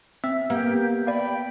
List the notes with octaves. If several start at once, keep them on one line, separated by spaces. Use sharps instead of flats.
C4 E5
A#3 B3 G4
D5 F5 G5 B5